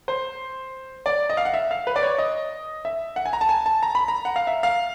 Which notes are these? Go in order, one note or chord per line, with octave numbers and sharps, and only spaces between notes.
C5
D5
D#5
F5
F#5
E5
F5
B4
D5
C#5
D#5
E5
F#5
G#5
A#5
A5
G#5
A5
A#5
B5
A#5
F#5
F5
E5
F5